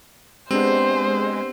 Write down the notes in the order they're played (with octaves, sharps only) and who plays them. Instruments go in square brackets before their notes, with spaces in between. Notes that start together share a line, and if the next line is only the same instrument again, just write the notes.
[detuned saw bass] G#3 [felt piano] B3 D4 G4 [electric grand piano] C4 [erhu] C5